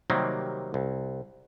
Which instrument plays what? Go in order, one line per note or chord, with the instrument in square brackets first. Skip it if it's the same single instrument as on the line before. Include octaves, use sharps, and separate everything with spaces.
[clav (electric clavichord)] C3 D#3 F#3 G3 A#3 C4
C2